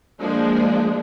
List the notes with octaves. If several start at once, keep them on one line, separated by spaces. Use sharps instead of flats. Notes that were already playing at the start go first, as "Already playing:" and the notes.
F3 G#3 A#3 D4